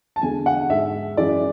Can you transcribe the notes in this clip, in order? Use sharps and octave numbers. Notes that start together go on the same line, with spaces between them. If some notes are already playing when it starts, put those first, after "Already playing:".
A5
E2 D3 G#3 G#5
F#5
G#2 G#3 E5
F#2 E3 G#3 D5